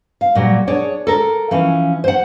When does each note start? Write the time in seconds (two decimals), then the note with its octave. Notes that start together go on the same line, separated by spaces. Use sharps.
0.21 F5
0.35 A#2 F#3 G3
0.67 D4 G#4 C#5
1.07 A4 A#4
1.51 E3 F3 C#4
2.04 C5 F#5